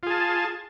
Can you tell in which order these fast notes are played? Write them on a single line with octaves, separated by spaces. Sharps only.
F4 G#4 A5